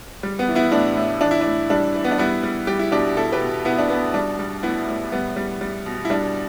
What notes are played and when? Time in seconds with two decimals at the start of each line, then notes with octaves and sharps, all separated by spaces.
0.23 G3
0.39 B3
0.48 E3
0.55 B3 E4
0.72 A2 D4
0.97 A2
1.21 E3 D4
1.31 E4
1.41 A2 D4
1.70 G3 D4
1.94 E3
2.05 B3
2.11 D4
2.18 G3 B3 E4
2.43 G3
2.67 G3 G4
2.79 E4
2.92 B2 D4 G4
3.16 B2 E4 A4
3.32 G4 B4
3.41 B2
3.65 B2 B3 E4
3.78 D4
3.90 B2 B3
4.14 G3 D4
4.39 G3
4.63 A2 B3 E4
4.88 A2
5.12 G3 B3
5.36 G3
5.61 G3
5.86 B2
6.05 E4
6.10 G3 D4